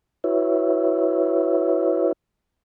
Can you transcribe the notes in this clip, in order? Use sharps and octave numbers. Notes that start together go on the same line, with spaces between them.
E4 F#4 B4 C#5 E5